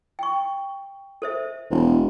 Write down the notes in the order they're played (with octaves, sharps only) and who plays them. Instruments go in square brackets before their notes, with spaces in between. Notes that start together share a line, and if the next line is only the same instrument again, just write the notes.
[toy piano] G5 C#6
A4 C5 E5
[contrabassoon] E1